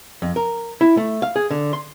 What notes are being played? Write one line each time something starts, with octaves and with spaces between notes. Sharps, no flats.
F2
A#4
E4
A3
F5
G#4
D3
C6